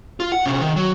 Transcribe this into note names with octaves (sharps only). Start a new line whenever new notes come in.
F4
F#5
C3 C#4
D#3
F#3